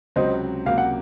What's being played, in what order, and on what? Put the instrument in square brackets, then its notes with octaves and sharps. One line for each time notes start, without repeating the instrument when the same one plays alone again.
[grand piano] C#2 C3 F#3 C4 [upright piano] C5 D#5
[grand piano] C#2 C3 F#3 A#3 [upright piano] F5
[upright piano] F#5